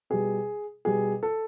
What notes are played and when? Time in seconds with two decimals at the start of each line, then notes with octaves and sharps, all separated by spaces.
0.10 B2 G3 G#4
0.85 B2 G3 G#4
1.23 A4